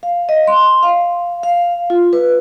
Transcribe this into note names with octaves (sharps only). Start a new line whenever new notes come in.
F5
D#5
C6
F5
F5
F4
B4